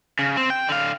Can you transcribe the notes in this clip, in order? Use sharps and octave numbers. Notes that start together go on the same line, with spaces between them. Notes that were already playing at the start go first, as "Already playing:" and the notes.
C#3
C4
G5
D3 F5